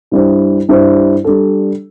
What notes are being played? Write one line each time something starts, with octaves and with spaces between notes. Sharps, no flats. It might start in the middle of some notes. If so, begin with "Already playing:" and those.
G2 G3 E4 C5
G2 G3 E4 C5
G3 D4 A4